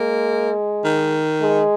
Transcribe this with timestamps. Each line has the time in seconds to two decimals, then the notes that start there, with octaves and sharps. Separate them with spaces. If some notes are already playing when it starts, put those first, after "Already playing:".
Already playing: G#3 A#3
0.85 D#3
1.41 G#3